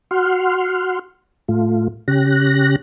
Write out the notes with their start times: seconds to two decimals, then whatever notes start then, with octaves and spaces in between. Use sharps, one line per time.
0.11 F#4 F#5 C6 F6
1.48 A2 A3 F4
2.08 C#3 C#4 G4 F#6 A#6